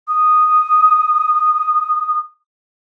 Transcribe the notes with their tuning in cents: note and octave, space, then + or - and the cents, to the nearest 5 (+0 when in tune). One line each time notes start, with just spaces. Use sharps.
D#6 -5